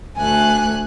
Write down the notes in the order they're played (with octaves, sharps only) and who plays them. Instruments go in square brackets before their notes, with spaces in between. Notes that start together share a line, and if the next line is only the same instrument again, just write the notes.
[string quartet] D2 A3 F#6 [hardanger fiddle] G#5